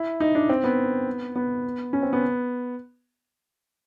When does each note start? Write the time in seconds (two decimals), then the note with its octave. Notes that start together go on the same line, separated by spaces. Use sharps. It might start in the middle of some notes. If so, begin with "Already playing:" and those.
Already playing: E4
0.20 D#4
0.35 D4
0.49 C4
0.64 B3
1.36 B3
1.93 C#4
2.03 C4
2.13 B3